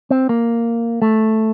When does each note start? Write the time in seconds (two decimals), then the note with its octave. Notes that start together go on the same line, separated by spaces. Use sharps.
0.11 C4
0.29 A#3
1.02 A3